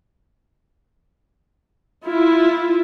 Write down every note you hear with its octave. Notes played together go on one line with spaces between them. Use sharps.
E4 F4